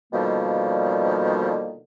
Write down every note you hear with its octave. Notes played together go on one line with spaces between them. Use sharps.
B2 D3 D#3 F3 G3 A#3